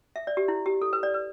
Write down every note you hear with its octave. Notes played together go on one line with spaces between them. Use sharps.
E5
D5
G4
E4
G4
A4
B4
D5
B4